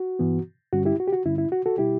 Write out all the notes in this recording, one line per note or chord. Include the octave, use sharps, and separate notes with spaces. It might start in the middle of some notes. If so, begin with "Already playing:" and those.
Already playing: F#4
G2 E3 B3
G2 D3 G3 C#4 F#4
E4 G4
F#4
G4
F#4
G2 D3 G3 C#4 E4
E4
F#4
F#4 A4
B2 G3 E4 G4